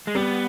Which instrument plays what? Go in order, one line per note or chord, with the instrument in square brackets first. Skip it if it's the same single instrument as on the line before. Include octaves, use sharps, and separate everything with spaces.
[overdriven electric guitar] G#3
[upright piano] G3 [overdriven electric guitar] B3